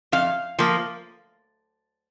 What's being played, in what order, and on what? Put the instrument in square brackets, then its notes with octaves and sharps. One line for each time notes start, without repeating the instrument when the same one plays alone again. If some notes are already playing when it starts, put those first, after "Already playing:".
[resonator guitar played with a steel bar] F2 F5
F3 A#3